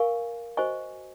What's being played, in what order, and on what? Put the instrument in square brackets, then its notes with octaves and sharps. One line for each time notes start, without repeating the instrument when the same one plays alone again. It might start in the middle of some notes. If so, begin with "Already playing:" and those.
Already playing: [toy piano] A#4 F5 G#5 C#6
F#4 C5 D#5 G#5 C#6